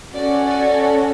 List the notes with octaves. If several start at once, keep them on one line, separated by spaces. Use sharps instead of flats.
C#4 F#4 A4 D5
D5